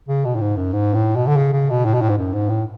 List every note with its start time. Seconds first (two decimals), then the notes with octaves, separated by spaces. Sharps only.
0.08 C#3
0.25 B2
0.35 A2
0.41 G#2
0.57 F#2
0.73 G#2
0.94 A2
1.16 B2
1.27 D3
1.37 C#3
1.53 C#3
1.70 B2
1.85 A2
1.94 B2
2.01 A2
2.09 G#2
2.18 F#2
2.33 G#2
2.49 A2